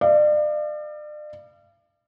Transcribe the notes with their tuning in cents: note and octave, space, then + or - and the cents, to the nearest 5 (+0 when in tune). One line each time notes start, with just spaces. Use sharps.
D5 +35 F5 -40